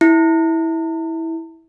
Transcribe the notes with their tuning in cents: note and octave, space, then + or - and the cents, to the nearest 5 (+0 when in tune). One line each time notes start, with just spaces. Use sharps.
E4 -15